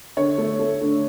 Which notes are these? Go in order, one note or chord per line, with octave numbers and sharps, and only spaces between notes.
D3 C#5
A3
A3
D3